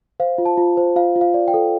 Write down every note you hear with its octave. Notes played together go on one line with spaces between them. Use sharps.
C5 F5
F4
A5
F4
C5
F4 F5
F4
F5
D5
G5
A4